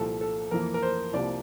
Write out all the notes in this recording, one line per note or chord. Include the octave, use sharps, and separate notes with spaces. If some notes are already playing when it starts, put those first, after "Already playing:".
Already playing: C2 A#2 F3 A4
A4
F2 E3 A#3 A#4
A#4
C5
C2 C3 F3 A#3 D5